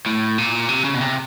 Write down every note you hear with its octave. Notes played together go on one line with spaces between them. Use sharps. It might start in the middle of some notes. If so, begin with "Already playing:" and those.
A2
A#2
C3
C#3
B2
C3